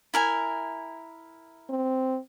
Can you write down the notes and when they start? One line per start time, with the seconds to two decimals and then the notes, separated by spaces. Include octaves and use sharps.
0.14 E4 A#4 G#5
1.70 C4